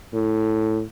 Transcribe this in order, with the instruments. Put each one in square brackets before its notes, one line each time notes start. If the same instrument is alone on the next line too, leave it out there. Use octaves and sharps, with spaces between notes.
[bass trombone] A2